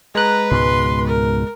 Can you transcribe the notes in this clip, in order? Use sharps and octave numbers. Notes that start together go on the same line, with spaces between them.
G#3 B4 A#5 F#6
C#2 G#2 B2 C6
A#4